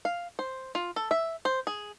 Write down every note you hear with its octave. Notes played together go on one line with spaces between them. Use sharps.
F5
C5
F4
A4
E5
C5
G#4